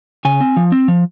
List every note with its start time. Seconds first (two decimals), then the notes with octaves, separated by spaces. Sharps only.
0.25 C#3 G#5
0.41 C4
0.57 F3
0.72 C4
0.88 F3